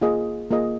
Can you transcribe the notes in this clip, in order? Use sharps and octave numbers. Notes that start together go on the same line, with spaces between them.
A#3 F4 G#4 D#5
A#3 F4 G#4 D#5